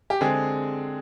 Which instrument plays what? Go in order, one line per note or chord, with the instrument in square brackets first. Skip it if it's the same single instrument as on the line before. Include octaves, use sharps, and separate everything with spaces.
[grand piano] G4
D3 G#3 C4 G#4